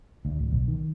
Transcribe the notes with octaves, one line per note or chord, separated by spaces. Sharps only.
D2
D1
B1
D#3